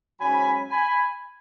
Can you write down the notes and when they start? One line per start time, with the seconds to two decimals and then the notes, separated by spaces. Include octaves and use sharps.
0.20 G#2 F#3 C#4 G#5 B5
0.70 G#5 B5